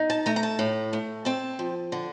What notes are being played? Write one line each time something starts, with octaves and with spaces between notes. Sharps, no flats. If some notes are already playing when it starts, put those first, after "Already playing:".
Already playing: D#4
A5
A3 A#5
A#5
A5
A2
A3
C4 A5
F3
D3